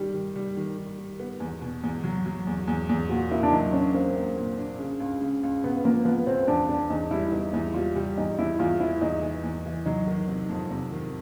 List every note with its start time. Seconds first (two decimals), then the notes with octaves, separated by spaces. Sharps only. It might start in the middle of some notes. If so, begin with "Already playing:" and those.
Already playing: D#3 G3 G4
0.14 D#3
0.36 G3
0.57 D#3
0.77 D#3
0.99 D#3
1.20 B3
1.40 E2
1.61 B2
1.83 E2
2.04 F#3
2.26 F#3
2.47 E2
2.67 E2
2.89 E2
3.09 A#2 F#4
3.31 A#3 E4
3.43 D4
3.52 F#3 D#4
3.73 C#4 D4
3.94 A#3 C4
4.16 A#3
4.37 A#2
4.57 D4
4.79 C#3
5.00 C#2
5.21 C#3
5.43 C#2
5.64 C#2 B3
5.84 F3 A#3
6.05 F3 B3
6.26 C#2 C4
6.48 E2 D4
6.69 B3 D4
6.90 E2 D#4
7.11 G3 E4
7.32 B3 D#4
7.53 E2 E4
7.74 G3 F4
7.96 G3 G4
8.17 E2 D#4
8.38 E2 E4
8.59 E2 F4
8.80 E3 E4
9.01 E2 D#4
9.22 E3
9.43 E2
9.65 E3
9.86 F#3 D#4
10.07 D#3
10.28 C3
10.49 F2
10.71 C3
10.92 D#3